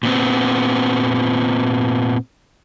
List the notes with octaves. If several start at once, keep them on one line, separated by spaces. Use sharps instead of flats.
A#2 B3 C4